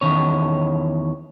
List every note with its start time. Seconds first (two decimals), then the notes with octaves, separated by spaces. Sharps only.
0.01 E2 D#3 C#4 C#5